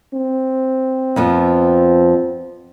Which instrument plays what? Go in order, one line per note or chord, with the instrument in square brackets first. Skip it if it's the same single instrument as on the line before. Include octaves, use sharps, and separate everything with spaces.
[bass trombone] C4
[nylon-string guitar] F2 F3 B3